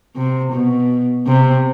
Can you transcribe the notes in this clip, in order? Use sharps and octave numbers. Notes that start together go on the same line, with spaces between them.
C3
B2
C3